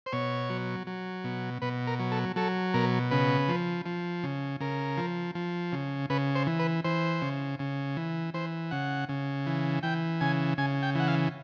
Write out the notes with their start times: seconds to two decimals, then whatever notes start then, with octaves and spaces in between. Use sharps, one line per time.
0.06 C5
0.13 B2 C#5
0.50 F#3
0.87 F#3
1.24 B2
1.62 B2 B4
1.87 A#4
1.99 F#3
2.12 A4
2.36 F#3 A4
2.74 B2 A#4
3.11 C#3 B4
3.48 F3
3.86 F3
4.23 C#3
4.60 C#3 A#4
4.97 F3
5.35 F3
5.73 C#3
6.10 C#3 B4
6.35 C5
6.47 E3
6.59 B4
6.84 E3 C5
7.22 C#3
7.59 C#3
7.97 E3
8.34 E3 C5
8.71 C#3 F#5
9.09 C#3
9.46 E3
9.83 E3 G5
10.21 C#3 G#5
10.58 C#3 G#5
10.83 G5
10.95 E3 F#5
11.08 F5